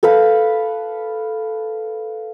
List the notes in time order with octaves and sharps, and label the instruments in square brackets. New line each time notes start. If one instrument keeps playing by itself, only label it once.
[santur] A4 B4 F5 B5